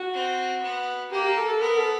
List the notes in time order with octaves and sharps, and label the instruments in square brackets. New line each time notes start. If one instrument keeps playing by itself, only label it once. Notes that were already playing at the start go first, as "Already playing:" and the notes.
Already playing: [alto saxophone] F#4
[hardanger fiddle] C4
B3
[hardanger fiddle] A#3 [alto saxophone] G4
[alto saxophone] G4
A4
A4
[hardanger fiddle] B3 [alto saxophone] A#4
[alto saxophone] A4